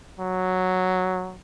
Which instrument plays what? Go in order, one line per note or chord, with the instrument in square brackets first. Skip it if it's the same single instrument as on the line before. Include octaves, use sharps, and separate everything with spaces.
[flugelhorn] F#3